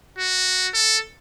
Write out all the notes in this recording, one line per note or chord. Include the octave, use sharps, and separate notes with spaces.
F#4
A4